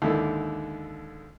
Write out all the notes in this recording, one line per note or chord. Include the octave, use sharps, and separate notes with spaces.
D#2 G#2 D3 E4 A4